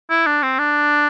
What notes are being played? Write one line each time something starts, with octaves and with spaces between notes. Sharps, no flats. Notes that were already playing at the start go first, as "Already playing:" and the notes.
E4
D4
C4
D4